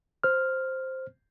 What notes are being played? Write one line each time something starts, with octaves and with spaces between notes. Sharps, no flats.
C5 F6